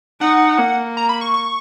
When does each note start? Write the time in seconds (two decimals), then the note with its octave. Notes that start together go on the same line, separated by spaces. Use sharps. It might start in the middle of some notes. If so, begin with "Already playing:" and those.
0.21 D#4 F#5
0.58 A#3
0.97 A#5
1.09 B5
1.21 C#6
1.34 C#6